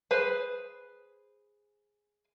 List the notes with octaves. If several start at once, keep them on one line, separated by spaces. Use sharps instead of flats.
G#4 B4 C5